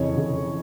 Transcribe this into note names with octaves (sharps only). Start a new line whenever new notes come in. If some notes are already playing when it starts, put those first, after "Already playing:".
Already playing: F2 C#3 E3 C#5 D#5
F2 C#3 E3